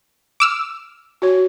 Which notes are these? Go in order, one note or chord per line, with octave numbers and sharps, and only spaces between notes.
D6 E6 F6
F#4 C#5